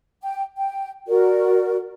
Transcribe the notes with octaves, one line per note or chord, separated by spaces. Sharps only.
G5
G5
F#4 A#4 D5